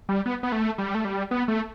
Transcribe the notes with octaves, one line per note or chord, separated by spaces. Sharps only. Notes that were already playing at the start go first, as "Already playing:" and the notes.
G3
B3
B3
A3
G3
A3
G3
B3
A3